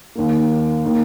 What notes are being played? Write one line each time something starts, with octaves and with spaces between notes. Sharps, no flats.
D#2 D#3 A#3
D#3 A#3